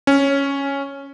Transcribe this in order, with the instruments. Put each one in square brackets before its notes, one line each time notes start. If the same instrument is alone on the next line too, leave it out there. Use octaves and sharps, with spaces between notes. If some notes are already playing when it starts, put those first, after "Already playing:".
[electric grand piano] C#4